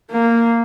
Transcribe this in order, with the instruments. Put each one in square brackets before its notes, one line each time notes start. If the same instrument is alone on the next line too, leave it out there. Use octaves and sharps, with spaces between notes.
[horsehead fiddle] A#3